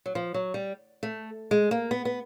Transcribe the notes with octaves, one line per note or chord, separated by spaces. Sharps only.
F#3
F3
F#3
G3
A3
G#3
A#3
B3
B3